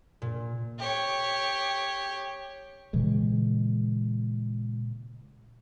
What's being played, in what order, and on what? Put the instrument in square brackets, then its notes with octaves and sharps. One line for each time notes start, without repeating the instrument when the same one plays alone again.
[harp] A#2
[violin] G4 C#5
[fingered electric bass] A#2 C#3 E3 G#3